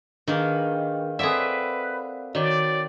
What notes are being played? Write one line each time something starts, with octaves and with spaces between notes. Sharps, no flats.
D#3 A#3 D4 D#4 G#4 A#4 B4
A#3 C4 G#4 A4 B4 D5 E5 F#5
D#3 F#4 C#5 D5 D6